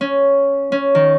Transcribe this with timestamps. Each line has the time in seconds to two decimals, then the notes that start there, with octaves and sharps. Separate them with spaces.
0.01 C#4
0.72 C#4
0.95 D#3